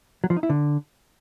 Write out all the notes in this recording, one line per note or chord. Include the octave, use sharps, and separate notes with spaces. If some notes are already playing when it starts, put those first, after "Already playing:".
F#3
F3
D#4
E4
D3